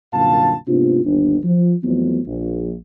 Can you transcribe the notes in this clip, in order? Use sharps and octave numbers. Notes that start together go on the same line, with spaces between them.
C2 F#2 A#2 D3 F5 A5
G#2 C3 A#3 B3 D4 F4
G1 D#2 D4
F3
F2 E3 F#3 A3 B3
A#1